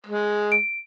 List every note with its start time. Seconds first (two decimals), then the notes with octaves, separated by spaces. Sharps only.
0.06 G#3
0.52 D7